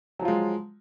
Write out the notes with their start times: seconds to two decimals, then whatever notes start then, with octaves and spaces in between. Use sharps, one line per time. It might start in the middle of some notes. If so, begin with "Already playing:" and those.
0.19 F#3
0.22 F3
0.25 F4
0.28 G#3